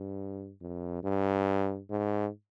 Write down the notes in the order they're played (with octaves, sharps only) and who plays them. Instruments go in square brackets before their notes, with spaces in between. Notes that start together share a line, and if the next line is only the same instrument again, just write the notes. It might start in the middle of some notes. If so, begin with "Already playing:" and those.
Already playing: [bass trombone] G2
F2
G2
G#2